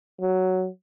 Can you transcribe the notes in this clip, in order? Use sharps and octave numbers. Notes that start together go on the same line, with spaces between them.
F#3